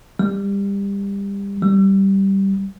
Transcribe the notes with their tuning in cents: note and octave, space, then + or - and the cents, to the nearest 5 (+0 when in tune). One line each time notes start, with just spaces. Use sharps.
G3 +25
G3 -10